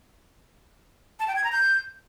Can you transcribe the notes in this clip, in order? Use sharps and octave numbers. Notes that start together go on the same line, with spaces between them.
A5
G5
G#6
A#5
G6